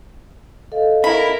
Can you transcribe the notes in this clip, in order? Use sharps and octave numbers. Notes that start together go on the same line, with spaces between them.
A4 D#5 F5
E4 A#4 B5